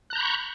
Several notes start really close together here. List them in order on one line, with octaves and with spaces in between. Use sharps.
F#6 A#5 G6 B5 C#6